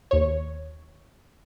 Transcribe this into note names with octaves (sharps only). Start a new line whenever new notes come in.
D#2 C#5